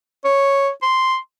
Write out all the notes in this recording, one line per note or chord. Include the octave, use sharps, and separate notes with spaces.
C#5
C6